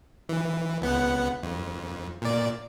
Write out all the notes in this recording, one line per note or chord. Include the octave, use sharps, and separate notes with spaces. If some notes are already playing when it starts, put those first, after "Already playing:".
E3
C#2 B3 F#5
F2
A#2 D5